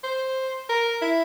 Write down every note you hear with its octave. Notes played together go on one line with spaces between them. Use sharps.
C5
A#4
E4